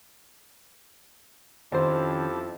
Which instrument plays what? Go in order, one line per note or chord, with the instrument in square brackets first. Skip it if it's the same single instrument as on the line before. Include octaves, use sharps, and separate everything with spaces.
[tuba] F2 [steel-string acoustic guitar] D#3 C#4 [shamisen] C4 C5 [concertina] E4 G4 A5